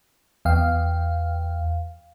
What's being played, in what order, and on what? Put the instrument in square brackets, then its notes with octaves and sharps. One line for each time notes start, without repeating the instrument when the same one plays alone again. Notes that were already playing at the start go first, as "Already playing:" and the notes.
[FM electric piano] E2 F5 G5